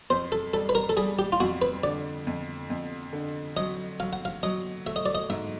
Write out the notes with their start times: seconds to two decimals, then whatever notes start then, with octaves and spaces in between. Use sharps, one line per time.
0.10 F2 C5
0.32 A4
0.54 G3 A4
0.69 B4
0.75 A#4
0.89 A4
0.96 G3 G#4
1.19 G4
1.32 F4
1.40 F2 F#4
1.62 B4
1.83 D3 D5
2.27 F2
2.70 F2
3.13 D3
3.56 F#3 D#5
4.00 F#3 F5
4.13 F#5
4.25 F5
4.43 F#3 D#5
4.86 A3 E5
4.96 D#5
5.06 D5
5.15 D#5
5.29 G#2 E5